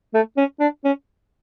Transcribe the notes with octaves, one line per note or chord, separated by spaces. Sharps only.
A3
C#4
D4
C#4